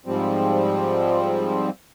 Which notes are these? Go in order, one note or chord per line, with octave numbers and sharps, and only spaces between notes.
G#2 F3 G3 C4